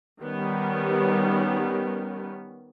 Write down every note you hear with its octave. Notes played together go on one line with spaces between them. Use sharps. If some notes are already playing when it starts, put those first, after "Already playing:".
D#3 G3 B3 C#4 G4